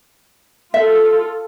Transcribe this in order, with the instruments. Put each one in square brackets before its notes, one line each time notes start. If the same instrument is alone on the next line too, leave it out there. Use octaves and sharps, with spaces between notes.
[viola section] F4 A4 [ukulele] E5